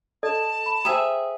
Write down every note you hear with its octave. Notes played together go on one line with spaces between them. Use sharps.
A4 D5 D#5 A5
B5
G#4 C5 E5 G5 A#5 D#6